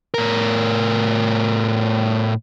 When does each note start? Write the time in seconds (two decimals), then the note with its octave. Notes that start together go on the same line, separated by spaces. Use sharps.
0.14 A2 A#4